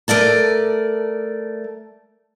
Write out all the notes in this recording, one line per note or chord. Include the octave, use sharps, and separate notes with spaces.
A3 A#4 D5 A5